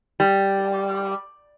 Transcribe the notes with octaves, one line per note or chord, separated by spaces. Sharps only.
G3